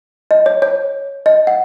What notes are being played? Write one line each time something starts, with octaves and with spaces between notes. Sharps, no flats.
D#5
C#5
C#5
D#5
F#5